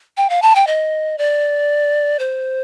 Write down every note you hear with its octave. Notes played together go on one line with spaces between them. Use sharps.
G5
F5
A5
G5
D#5
D5
C5